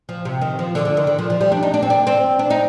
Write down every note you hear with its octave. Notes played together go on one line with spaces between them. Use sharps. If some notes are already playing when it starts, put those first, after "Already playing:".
F3
C3
D#3
F3
D3
D3
D#3
D3
F3
F3
G3
D4
D#4
D4
C4
D4
C4
D4
D#4